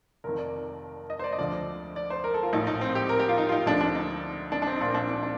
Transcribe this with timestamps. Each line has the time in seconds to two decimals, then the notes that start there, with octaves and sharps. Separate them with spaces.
0.24 F1 F2 D#3 A#4
0.39 D5
1.10 D#5
1.19 C5
1.24 D5
1.32 D#5
1.38 D2 D3 F3 D5
1.96 D5
2.10 C5
2.24 A#4
2.34 A4
2.43 F4
2.53 A#1 A2 F3 D#4
2.67 D#4
2.81 C4
2.95 G4
3.09 A#4
3.20 G4
3.29 F4
3.38 D#4
3.49 F4
3.52 D#4
3.66 D2 D3 F3 D4
3.81 D4
3.95 D#4
4.52 D4
4.62 D4
4.67 C4
4.76 D#4
4.80 A#1 A#2 F3 D4
4.88 C4
4.94 D4
5.09 D4
5.23 D4